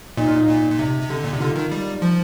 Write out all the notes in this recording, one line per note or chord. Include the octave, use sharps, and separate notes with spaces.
A#2 D#4
F4
D#4
A#2
A#2
C3
C3
D3
A#2
C3
D3 F4
D#3
G3
F3